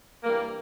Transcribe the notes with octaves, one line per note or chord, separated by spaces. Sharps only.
G2 E3 G3 A#3